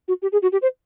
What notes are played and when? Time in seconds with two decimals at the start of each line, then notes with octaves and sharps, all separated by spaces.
0.08 F#4
0.22 G4
0.32 G#4
0.42 F#4
0.52 G4
0.62 C5